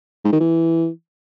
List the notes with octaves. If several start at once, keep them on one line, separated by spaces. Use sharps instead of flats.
G#2
D#3
E3